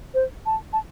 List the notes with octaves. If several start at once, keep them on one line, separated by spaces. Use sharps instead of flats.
C5
A5
A5